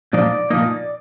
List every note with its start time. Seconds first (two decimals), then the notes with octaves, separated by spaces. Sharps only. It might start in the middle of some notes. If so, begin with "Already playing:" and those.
0.13 A#2 F3 A#3 D#4 D5
0.50 A#2 F3 A#3 D#4